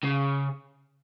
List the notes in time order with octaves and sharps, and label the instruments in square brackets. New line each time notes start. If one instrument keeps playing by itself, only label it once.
[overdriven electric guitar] C#3